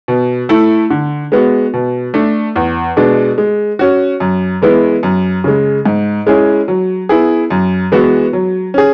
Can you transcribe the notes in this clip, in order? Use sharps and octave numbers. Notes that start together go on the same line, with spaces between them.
B2
A3 E4 A4
D3
G#3 B3 F#4
B2
A3 D4
E2
B2 G#3 D4
G#3
C#4 F#4
F#2
E3 G#3 B3 E4
F#2
C#3 G#3
G#2
G#3 C#4 E4 G#4
F#3
B3 E4 G#4
F#2
E3 G#3 B3 F#4
F#3
C#4 G#4